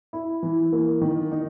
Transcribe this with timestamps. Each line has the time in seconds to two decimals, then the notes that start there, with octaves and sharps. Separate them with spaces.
0.13 E4
0.43 E3
0.72 A#3
1.01 D#3
1.31 D#4